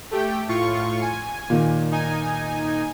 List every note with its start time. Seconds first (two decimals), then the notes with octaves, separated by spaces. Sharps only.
0.11 A3 G4 G5
0.48 A2 F4 C#6
1.02 G#5
1.50 A#2 D#3 A#3
1.91 D#4 G#5